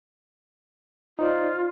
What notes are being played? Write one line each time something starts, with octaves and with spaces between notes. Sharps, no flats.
D#4 F4 C5 D5